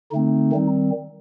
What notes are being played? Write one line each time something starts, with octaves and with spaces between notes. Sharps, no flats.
D3 A3 C4 D#4
D#3 G3 C4